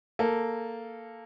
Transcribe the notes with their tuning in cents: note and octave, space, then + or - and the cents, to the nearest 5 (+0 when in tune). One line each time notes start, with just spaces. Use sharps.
A#3 -10 A4 -5